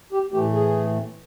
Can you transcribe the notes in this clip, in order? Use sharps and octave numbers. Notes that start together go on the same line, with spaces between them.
G4
A2 E3 A3 G4
G#4